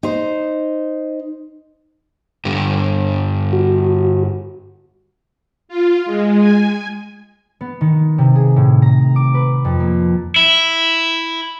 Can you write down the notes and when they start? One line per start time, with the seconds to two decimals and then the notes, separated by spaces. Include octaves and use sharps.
0.03 D#4 C5
2.45 G2 D3
3.53 F#4
5.69 F4
6.06 G#3
6.40 G#5
7.61 B3
7.81 D#3
8.18 C3
8.35 G#4
8.56 A2
8.82 A#5
9.16 D6
9.34 B4
9.65 F2
9.80 A#3
10.36 E4